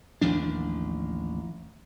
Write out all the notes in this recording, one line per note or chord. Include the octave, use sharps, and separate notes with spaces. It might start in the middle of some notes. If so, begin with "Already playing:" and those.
A1 D#2 F3 D4